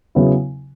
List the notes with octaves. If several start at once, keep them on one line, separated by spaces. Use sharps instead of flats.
C#3 F#3 B3 E4